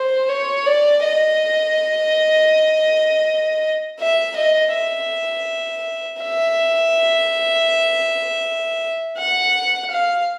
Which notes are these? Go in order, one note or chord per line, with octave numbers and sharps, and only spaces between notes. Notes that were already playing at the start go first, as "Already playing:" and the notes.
Already playing: C5
C#5
D5
D#5
E5
D#5
E5
E5
F#5
F5